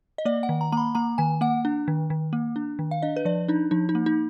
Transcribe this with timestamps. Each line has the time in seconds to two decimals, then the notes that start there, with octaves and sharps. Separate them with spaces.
0.18 D#5
0.25 A#3 D5
0.43 F#5
0.49 D#3
0.61 A#5
0.72 A#3 A#5
0.77 B5
0.95 A#3 A#5
1.18 D#3 G#5
1.41 A#3 F#5
1.65 D4
1.88 D#3
2.10 D#3
2.33 A#3
2.56 D4
2.79 D#3
2.91 F5
3.02 D4 D#5
3.16 B4
3.25 F3 D5
3.48 D4 D#4
3.71 F3 D#4
3.89 D#4
3.95 A#3
4.06 D#4